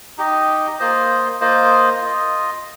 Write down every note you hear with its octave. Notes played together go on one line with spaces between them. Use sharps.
D#4 G4 D#5
A#3 F4 C5 D#5
A#3 F4 C5 D#5
F4 D#5